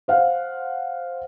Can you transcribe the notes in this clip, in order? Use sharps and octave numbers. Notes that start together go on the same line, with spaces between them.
C5 F5 F#5